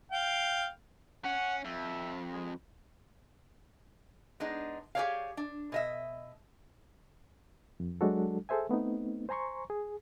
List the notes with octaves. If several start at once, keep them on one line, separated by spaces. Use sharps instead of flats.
F5 G5
C#4 F#5
F2 E5
G#3
G#3 B3 D4 D#4
G4 G#4 A#4 C#5 D5 F5
D4
B2 D#5 E5
F2
F#3 G#3 D4 F#4 A4
G#4 A4 C5 E5 G#5
A3 B3 C4 D#4
C5 G#5 A#5 C6 C#6
G#4